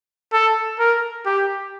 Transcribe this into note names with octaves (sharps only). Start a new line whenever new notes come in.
A4
A#4
G4